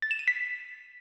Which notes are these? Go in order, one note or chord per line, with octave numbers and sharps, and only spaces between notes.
A6
E7
D#7
B6